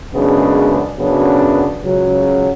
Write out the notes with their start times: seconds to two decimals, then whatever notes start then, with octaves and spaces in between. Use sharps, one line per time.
0.13 F#2 C#3 G#3 B3 D4
0.97 F#2 C#3 F#3 B3 D4
1.82 C#2 C#3 F#3 C#4